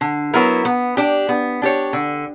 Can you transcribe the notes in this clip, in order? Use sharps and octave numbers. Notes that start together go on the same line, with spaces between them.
D3
F#3 B3 E4 A#4
B3
D4 G4
B3
D4 G4 C#5
D3